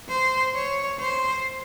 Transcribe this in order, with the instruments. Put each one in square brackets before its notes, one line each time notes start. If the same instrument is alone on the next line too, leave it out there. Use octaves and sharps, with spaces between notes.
[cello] C5
C#5
C5